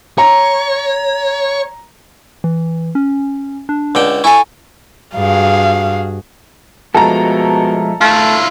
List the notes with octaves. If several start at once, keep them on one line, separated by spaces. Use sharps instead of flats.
C#5 A#5
E3
C#4
D4
C#2 D3 G5
E4 A4 G#5 C#6
G2 F#4 G#4 F5
B2 F3 G#3 A3 A4 A#5
A3 E4 F4